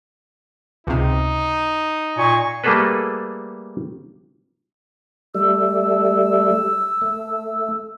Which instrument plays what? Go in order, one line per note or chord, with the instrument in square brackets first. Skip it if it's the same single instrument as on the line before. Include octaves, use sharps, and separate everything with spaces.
[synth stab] C#2 C3 [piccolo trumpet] D#4
[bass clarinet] A#2 [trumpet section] G#5 C#6
[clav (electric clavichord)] G3 A3 A#3 G#4 A4 B4
[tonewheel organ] G3 A3 [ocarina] E6
[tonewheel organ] A3